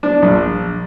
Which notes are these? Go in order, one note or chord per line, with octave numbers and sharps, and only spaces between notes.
D4
A#1